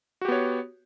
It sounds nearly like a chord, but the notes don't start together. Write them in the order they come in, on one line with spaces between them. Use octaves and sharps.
F#4 G4 B3 C#5